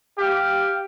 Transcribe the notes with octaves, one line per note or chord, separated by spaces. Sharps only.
G4 F5